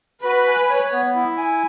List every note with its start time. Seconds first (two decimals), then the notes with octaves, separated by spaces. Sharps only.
0.24 F#4 B4
0.47 G#5
0.70 C#5
0.92 B3
1.15 E4
1.38 G#5